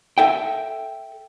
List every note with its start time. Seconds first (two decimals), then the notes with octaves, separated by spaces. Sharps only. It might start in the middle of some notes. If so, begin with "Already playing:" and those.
0.18 A4 E5 G5